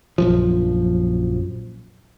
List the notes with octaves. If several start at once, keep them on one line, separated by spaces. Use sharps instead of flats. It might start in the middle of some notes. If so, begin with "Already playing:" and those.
A#1 F#2 F3